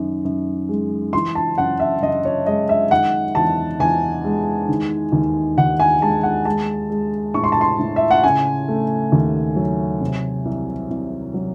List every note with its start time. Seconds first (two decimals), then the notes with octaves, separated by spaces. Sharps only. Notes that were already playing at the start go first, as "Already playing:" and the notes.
Already playing: F#2 D#3
0.25 F#2
0.69 G#3
1.13 E3 C6
1.35 A5
1.58 F#2 F#5
1.80 E5
2.02 F#2 D#5
2.25 C#5
2.46 G#3 D#5
2.69 E5
2.91 D#3 F#5
3.35 E2 A5
3.79 E2 G#5
4.25 G#3
4.69 D#3
5.12 D#2
5.58 D#2 F#5
5.80 G#5
6.01 G#3 A5
6.23 F#5
6.45 G#3 A5
6.90 G#3
7.34 A2 C#6
7.44 C6
7.52 A5
7.61 C6
7.79 A2
7.96 E5
8.11 F#5
8.23 C#3 G#5
8.68 A3
9.12 D#2
9.56 F#3
10.01 C3
10.45 C2
10.90 C2
11.34 F#3